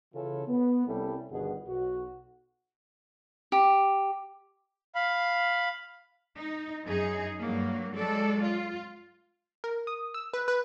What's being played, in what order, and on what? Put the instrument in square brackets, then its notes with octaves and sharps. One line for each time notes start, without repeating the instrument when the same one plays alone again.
[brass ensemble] C#3 E3 C#4 F4 A4 C#5
B3
C2 G3 C#4 E4 A4
G1 G2 B2 D#3 G#4 F#5
B1 F#4
[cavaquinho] G4
[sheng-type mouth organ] F5 B5
[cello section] D#4
F#2 D#4 G#4
G2 F#3 A#3
F#3 G#3 A4 D5
F4
[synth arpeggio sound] A#4
D#6
E6
B4
B4